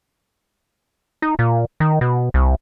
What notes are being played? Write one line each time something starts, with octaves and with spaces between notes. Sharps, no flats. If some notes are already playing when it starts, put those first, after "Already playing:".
D#4
A#2
D#3
B2
C2